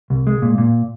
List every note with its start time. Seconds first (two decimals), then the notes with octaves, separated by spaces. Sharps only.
0.10 C2
0.27 G#3
0.42 A#2
0.58 A#2